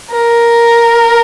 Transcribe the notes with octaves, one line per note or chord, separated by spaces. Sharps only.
A#4